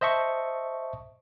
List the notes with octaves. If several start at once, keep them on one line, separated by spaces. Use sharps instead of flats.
C5 D#5 E5 A5 C#6